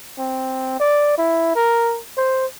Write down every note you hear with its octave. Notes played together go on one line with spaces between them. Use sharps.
C4
D5
E4
A#4
C5